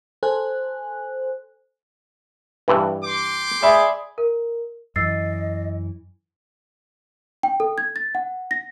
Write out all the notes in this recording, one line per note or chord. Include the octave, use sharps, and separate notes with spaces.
A4 C5 G#5 F#6
G2 E3
G5 C6 D6
G#4 D5 E5 B5
A#4
F#2 E3 D#5 E6 A6 C7
G5
A4
G#6
A6
F#5
A#6